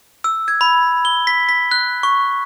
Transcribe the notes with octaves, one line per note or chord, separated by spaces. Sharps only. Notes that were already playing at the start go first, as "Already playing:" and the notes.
E6
G#6
B5
G7
B6
B6
F#6
C#6